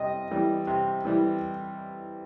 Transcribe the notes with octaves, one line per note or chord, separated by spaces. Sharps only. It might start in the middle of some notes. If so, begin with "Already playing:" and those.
Already playing: C3 G3 D#5
E3 G3
C3
E3 G3